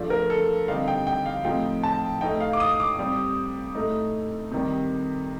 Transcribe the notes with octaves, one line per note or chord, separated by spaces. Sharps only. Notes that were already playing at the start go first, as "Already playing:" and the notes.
Already playing: F3 A3 D4
A#4
A4
D3 G3 C4 D#4 F5
G5
G5
F5
A2 F3 C4 D#4 G5
A5
A2 A3 D#4 G5
F5
D6
D#6
D6
C3 G3 C4
A2 A3 D#4
C3 D#3 G3